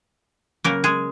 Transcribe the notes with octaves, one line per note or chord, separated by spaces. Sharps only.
C#3 F#3 A#3 A#4
G#3 G#4